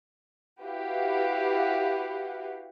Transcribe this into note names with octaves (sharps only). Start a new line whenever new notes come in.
E4 F#4 G4 B4 F5 F#5